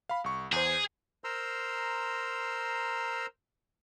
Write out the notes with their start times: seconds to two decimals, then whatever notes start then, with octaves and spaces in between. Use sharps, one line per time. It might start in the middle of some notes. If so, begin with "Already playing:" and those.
0.09 F5 B5
0.24 C2 C#6
0.52 E2 G#4 C5
1.24 A#4 C5 A#5 C6 E6